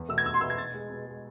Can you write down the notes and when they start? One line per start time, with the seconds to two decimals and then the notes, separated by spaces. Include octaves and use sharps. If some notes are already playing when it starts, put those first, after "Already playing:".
Already playing: E2
0.09 B2 A3 E6
0.18 G#6
0.25 E2 E6
0.34 C6
0.41 B2 A3 E6
0.50 G#6
0.58 B2 A6
0.74 G#3
0.90 B2
1.06 G#3